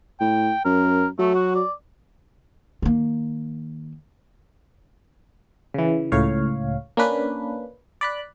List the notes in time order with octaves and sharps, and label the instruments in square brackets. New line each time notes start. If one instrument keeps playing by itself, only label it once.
[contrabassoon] A2 [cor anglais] G5
[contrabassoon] F#2 [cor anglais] A#4
[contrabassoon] F#3 [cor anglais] A3
[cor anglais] F#4
D5
[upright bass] D#3 A#3
[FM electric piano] C#3 E3
C#2 A2 C#5 F5
A#3 C#4 D4 B4
D5 B5 F#6